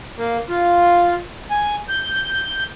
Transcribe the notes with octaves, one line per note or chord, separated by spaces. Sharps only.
A#3
F4
G#5
G6